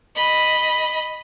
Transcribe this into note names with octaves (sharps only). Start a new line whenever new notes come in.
D#5 B5